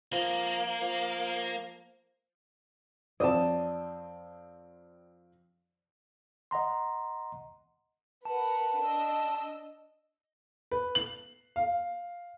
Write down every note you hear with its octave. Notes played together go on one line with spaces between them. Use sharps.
F3 A#3
F3
F2 C4 D5 A5 D#6
D#5 F#5 A#5 C6
A#4 B4 F#5 A5
D4 D#5 E6
B4
F#7
F5